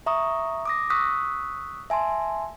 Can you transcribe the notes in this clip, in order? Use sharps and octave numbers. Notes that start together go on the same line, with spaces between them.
E5 A#5 C#6 D#6
D6 D#6 A#6
C#6 D#6 E6 F#6 B6
E5 G#5 A5 C6